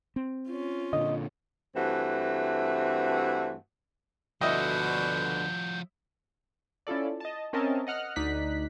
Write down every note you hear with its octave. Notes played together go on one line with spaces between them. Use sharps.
C4
C#4 F4
A#2 D3 D#5
G2 E3 A3 C4 F#4
D2 B2 D3 F3 E4 F#4 D#5 G6
C#4 E4 F4 A4 D5
D#5 A5
C4 C#4 A#4 D#5 E5 A5
D#5 F#5 F6 F#6
D2 D#4 D5 F#6 B6